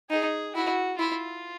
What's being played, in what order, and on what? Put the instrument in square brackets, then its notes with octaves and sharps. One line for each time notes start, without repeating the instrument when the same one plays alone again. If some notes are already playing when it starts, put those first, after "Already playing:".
[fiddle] D#4 [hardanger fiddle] G#4
[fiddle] E4 [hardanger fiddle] F#4
[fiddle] E4 [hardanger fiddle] F4